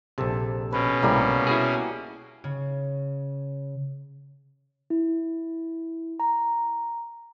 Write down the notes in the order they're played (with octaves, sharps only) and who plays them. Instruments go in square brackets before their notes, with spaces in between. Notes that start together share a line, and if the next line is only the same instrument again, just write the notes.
[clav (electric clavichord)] A#1 C3 [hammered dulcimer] A4
[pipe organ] B2 C#4 [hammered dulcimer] B4
[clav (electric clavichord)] C2 A2 [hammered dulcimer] G3 A#3
[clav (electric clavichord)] E4 F#4 G#4
[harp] C#3
[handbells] E4
A#5